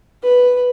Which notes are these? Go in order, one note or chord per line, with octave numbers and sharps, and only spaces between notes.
B4